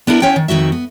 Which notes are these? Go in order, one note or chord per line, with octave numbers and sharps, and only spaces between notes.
B3 D4 E4 A#4
C#4 C#5 F#5 G5
D#3
F2 D#3 C4 F#4 E5
B3